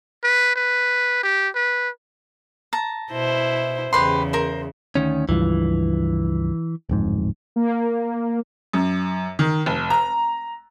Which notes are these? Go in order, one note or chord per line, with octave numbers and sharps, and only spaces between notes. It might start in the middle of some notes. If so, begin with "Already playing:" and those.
B4
B4
G4
B4
A5 A#5
B2 E4 C5
E2 C#3 G4 B4 C6
A#4 C5
D2 D#3 C#4
C#2 G2 E3 F3
D1 F2 G#2
A#3
F#2
D#3
F1
A#5